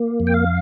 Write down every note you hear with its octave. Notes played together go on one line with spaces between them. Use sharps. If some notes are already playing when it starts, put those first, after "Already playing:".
Already playing: A#3
F2
G5
F5